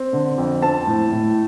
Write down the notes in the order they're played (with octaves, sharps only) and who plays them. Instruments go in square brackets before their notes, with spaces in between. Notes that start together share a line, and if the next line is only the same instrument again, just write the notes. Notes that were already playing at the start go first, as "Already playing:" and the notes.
Already playing: [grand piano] C4
D3
F2
C4 A5
A2
A2